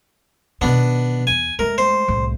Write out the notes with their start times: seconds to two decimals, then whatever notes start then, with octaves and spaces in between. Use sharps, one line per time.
0.61 B2 D#3 B3 D4
1.27 E2 G#5
1.59 G#3 A3 A#4
1.78 C5
2.08 C2 A2